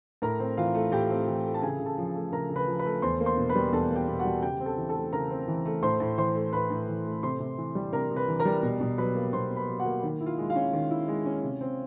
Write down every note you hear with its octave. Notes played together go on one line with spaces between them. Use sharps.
A2 A#4 A#5
C4
E3 F4 F5
A3
A2 G4 G5
C4
E3
A3
A5
C#3 G#4 G#5
C#3
A4 A5
F3
A3
C#3 A#4 A#5
C#3
B4 B5
F3
B4 B5
A3
E2 C5 C6
A#3
C5 C6
B2
B4 B5
G3
E2 A4 A5
A#3
G4 G5
B2
F#4 F#5
G3
C#3 G4 G5
C4
A4 A5
E3
A4 A5
A3
C#3 A#4 A#5
C4
E3
A3
A2 C5 C6
A2
E3 C5 C6
A3
A2 B4 B5
A2
E3
A3
C3 C5 C6
C3
E3
G3
C3 A#4 A#5
C3
B4 B5
E3
A#4 A#5
G3
B2
B2
F#3 B4 B5
A#3
B2 C5 C6
B2
B4 B5
F#3
F#4 F#5
A#3
D#3
E4
F4 F5
G#3
F4 F5
C#4
D#3
E4
G#3
C#4
C3
C4